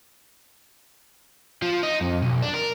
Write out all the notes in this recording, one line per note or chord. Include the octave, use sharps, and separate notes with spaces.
F3
D#4
F2
B1
D4
A#4